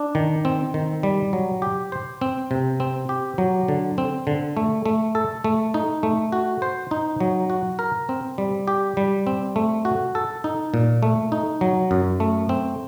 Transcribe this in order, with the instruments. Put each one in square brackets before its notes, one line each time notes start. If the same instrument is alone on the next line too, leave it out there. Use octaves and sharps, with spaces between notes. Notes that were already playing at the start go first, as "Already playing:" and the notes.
Already playing: [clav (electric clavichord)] D4
D#3
C4
D#3
G3
F#3
G4
C5
C4
C3
C4
G4
F#3
D3
C4
D3
A3
A3
A4
A3
D#4
A3
F#4
C5
D#4
F#3
F#4
A#4
C4
G3
G4
G3
C4
A3
F#4
A4
D#4
A#2
A3
D#4
F#3
F#2
A3
C4